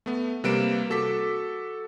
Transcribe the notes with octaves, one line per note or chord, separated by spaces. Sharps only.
A3 B3
C3 G3 A#3 B4 D7 E7
F#4 A4 D6 B6